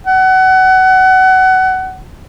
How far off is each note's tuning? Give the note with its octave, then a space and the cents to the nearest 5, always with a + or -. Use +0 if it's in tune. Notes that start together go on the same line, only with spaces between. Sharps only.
F#5 +25